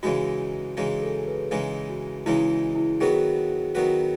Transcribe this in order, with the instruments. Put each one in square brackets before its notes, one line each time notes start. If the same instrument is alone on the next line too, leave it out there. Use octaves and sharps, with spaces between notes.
[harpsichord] C#3 E3 G#3 D#4 [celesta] F#4
[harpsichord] C#3 E3 G#3 D#4 [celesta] G#4
[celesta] A4
B4
[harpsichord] C#3 E3 G#3 D#4 [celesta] G#4
[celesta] F#4
[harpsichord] C#3 E3 G#3 D#4 [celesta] E4
[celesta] E4
[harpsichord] D#3 F#3 B3 F#4 B4 [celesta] G#4
[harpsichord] D#3 F#3 B3 F#4 B4